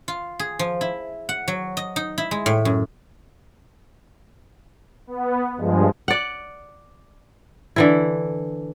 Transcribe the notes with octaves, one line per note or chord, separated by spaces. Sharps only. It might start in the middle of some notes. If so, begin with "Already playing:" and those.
F4
G#4
F3
E4
F#5
F#3
D#5
D#4
E4
G#3
A2
F#2
B3
G2 F3 G#3
D5 F#5
D3 E3 E4